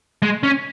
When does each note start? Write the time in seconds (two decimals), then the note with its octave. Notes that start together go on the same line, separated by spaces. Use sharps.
0.22 G#3
0.43 C#4